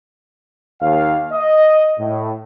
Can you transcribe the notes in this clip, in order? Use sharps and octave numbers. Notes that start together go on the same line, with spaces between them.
D#2 F5
D#5
A2